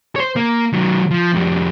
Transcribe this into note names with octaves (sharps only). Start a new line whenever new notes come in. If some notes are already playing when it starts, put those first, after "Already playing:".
C5 C#5
A#3
D#3 F#3
F3
F2 G3